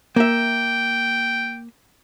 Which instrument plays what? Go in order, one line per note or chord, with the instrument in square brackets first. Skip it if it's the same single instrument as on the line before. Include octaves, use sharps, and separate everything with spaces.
[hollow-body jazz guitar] A#3 E5 [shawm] G5